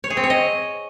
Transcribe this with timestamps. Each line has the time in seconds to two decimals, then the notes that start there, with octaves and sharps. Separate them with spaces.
0.04 C#5
0.10 G#4
0.17 C4
0.23 C#5
0.30 D#5